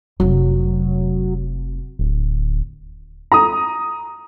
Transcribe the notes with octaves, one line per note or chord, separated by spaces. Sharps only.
F1 C3 F#3
D1
A#5 D#6